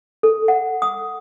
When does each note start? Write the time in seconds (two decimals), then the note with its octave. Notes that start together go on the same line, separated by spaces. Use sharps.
0.23 A4
0.48 F#5
0.82 D#6